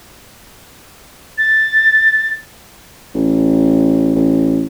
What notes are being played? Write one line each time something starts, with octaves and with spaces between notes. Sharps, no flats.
A6
A1
A1